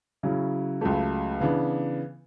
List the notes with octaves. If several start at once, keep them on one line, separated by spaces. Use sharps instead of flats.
C#3 F#3 C#4 E4
C#2 C#3 F#3 A3
C#3 E3 B3 D4